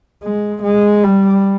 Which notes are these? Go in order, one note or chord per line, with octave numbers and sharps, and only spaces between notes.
G#3
G#3
G3